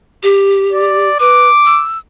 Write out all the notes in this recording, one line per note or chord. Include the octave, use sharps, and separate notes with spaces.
G4
D5
B4 D6
E6